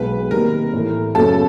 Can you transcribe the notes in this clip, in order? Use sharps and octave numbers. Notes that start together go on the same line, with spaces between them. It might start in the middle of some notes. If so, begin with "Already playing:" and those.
Already playing: B1 B2 G#3 B4
C3 D#3 G3 A#3 A#4
A2 E3 A3
F#2 C#3 F#3 B3 A4